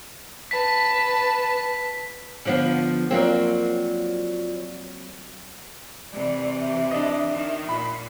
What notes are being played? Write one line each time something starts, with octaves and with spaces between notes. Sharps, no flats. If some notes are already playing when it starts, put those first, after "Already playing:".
B4 A5 B6
D3 F3 B3
F#3 A#3 C4 F4 C#5 D5
C3 E3 D5
E5
D4 D#5
D#3
A#2 B5